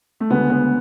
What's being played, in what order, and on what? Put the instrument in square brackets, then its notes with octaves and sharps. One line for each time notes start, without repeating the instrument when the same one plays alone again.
[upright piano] A3
D2 C#3 G#3 B3
B3